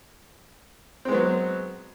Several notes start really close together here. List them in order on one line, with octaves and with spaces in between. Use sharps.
C4 G#3 B3 F#3